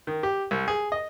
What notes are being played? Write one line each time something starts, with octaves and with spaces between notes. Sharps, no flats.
D#3
G4
C2
G#4
D#5